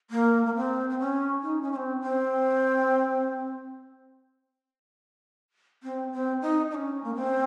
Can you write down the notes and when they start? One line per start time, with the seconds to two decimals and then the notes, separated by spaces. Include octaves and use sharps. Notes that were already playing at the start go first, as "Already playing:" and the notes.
0.11 A#3
0.46 A#3
0.55 C4
0.90 C4
0.99 C#4
1.42 D#4
1.62 C#4
1.72 C#4
1.76 C4
2.01 C4
5.83 C4
6.12 C4
6.42 D#4
6.71 D#4
6.75 C#4
7.04 A#3
7.15 C4